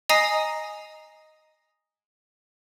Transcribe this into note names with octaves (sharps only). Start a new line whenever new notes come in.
D#5 G#5 A#5 D#6 A#6 C7